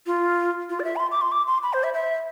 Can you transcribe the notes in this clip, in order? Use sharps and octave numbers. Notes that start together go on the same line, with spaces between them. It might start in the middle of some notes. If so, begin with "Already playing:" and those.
F4
F4
D5
E5
B5
C6
D6
C6
D6
C6
B5
C5
E5
E5